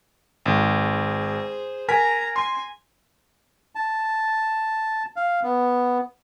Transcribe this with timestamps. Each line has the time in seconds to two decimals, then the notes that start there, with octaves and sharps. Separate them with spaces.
0.46 G#1 G#4 C5
1.88 A#4 G#5 A#5 B6
2.36 G#5 C6
3.75 A5
5.16 F5
5.43 B3